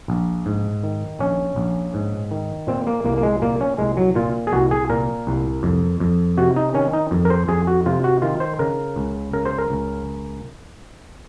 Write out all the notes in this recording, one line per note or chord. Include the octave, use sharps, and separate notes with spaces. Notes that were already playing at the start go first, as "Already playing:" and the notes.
A#1
G#2
D#3
A#1 C#4
A#1
G#2
D#3
A#2 C4
A#3
C2 A#3
A#3
G#3
A#2 A#3
C#4
C2 G#3
F#3
A#2 F4
G#4
C2 F#4
G#4
A#2 A#4
C2
F2
F2
C3 F#4
D#4
D#3 C#4
D#4
F2
A#4
C5
F2 G#4
F#4
C3 F4
F#4
D#3 F4
C5
C#3 A#4
C#2
C#3 A#4
C5
A#4
C#2